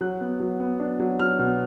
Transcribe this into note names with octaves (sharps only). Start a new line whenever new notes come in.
F#3 F#6
B3
F#3
B3
D4
F#3
F#3 F6
B2